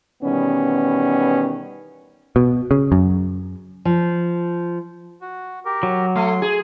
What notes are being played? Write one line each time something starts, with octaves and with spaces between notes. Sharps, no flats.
B2 D#3 E3 G3 B3 C#4
B2
C#3
F#2
F3
F#4
G4 A#4
F#3
A3 C6
G#4